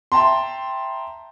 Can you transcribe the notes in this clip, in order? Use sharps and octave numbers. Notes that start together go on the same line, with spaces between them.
E5 G5 A5 A#5 C6